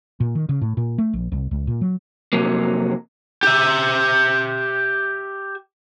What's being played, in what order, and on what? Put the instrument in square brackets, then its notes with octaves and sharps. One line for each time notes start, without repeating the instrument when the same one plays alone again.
[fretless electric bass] A#2
D#3
C#3
A2
A#2
A3
A#1
C2
C#2
A#2
F#3
[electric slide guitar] F2 C3 F#3 A#3
[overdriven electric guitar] G4 E5